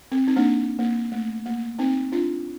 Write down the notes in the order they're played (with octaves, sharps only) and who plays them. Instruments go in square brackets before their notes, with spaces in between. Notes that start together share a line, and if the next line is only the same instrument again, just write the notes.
[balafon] C4
C4 D#4
A#3 D4
A#3
A3
A#3
C4 D#4
D4 F4